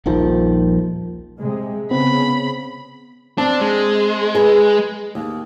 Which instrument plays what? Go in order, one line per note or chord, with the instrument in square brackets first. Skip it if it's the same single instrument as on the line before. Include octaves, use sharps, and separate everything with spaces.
[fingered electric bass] D#1 A#1 D#3 F3
[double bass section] C3 G#3
[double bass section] C#3 [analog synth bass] B3 [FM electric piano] C4 [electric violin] B5
[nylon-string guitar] C4 A5 [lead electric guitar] D4
[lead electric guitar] G#3
[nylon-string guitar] G#4 B4
D#2